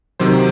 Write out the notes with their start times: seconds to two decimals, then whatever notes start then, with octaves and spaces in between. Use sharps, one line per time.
0.20 C3 D#3 F#3 C5